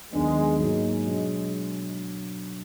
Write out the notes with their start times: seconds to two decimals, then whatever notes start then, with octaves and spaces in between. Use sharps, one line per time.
0.13 D#2 D#3 F#3 G#3 B3 D4
0.59 G#2 F#3 G#3 A#3 D#4
1.06 B2 F#3 D4